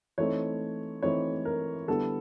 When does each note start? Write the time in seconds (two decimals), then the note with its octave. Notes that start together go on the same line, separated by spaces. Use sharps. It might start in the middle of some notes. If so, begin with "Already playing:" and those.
0.18 E3 A3 C4 D#4 C#5
1.02 E3 A3 C4 D#4 C#5
1.45 A#4
1.88 D3 G3 B3 E4 A4